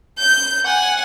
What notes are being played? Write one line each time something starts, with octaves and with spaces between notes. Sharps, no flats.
G6
F#5 G#5